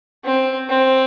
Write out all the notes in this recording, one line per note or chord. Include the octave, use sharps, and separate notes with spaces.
C4
C4